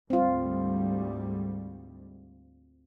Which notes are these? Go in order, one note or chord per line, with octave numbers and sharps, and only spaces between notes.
D2 G#2 G3 C4 F4